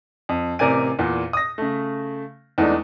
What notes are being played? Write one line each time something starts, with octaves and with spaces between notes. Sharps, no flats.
F2
A1 C3 A#4 D5 G#5 D#7
E2 A#2
D#6 A#6
C#3 A3
E2 E3 G#3 A3 D4 D#4